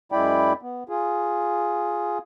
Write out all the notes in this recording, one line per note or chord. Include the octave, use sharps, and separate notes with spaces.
F#2 G#3 E4 D5 G5 B5
B3
F4 G#4